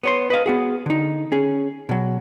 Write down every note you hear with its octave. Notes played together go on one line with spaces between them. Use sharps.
B3 C#5 C6
B4 D#5 F5
B3 F#4 G#4
D3 D#4
C#4 G#4
B2 F#3